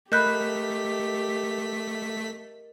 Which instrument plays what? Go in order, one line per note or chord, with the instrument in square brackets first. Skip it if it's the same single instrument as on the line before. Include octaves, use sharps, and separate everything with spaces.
[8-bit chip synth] A3 B6 [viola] G4 [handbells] A#4 D#5 [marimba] B5 F#6 G6